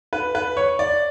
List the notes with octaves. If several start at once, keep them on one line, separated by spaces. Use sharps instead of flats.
B4
B4
C#5
D5